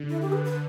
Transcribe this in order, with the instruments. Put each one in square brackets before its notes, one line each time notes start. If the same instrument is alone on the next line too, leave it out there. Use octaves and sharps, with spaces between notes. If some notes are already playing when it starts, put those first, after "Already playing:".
Already playing: [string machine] D3
[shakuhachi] E4
G4
B4
B4